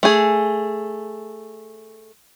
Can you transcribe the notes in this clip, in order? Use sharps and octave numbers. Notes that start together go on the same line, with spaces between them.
A3 G#4